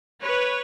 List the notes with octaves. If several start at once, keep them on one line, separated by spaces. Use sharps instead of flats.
B4 C#5